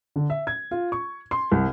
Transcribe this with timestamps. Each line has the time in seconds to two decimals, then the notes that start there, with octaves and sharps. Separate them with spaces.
0.16 D3
0.30 E5
0.47 G#6
0.71 F4
0.92 C#6
1.31 C6
1.52 C2